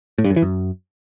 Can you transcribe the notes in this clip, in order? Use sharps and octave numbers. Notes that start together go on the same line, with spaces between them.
A2
G2
F#2
E3
F#2